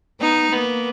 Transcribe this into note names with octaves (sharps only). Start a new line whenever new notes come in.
B3 D#4
A#3 B3